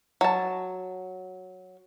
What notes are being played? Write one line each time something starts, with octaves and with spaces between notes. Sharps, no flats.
F#3 A5